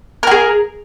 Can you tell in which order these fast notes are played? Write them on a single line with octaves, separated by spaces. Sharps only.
A#4 F#4 G#4